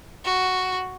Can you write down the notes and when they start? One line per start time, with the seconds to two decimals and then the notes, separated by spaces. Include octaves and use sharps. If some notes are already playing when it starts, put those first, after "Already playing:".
0.24 F#4